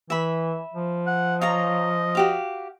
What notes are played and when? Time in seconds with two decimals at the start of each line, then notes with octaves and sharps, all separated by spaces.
0.10 E3 E5 B5
0.73 F3
1.07 F#5
1.41 F4 C#5 D#5 A#5
2.15 F#4 G4 F5